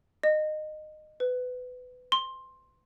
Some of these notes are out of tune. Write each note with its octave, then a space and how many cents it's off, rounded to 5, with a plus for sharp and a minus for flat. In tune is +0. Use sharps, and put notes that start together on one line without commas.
D#5 -20
B4 +20
C6 +15